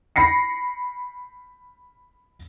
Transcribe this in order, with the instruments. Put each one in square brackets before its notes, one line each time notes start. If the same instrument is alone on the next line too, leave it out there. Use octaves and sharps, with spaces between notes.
[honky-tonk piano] B5 A#6 C7 C#7